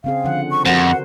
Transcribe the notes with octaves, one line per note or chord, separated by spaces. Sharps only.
C#3 C4 G#4 F5
D3 F3 F#5
C#6
F2 F#4 A#4 C5 F#5